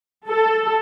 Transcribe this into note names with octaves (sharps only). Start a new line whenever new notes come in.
A4